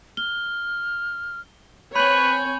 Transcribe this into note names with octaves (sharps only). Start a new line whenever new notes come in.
F6 G7
C4 B4 C#5 G#5 B5 G6 F#7